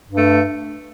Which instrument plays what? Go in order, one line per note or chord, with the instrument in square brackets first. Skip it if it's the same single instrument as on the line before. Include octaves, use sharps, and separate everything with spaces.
[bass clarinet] G2
[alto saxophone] A3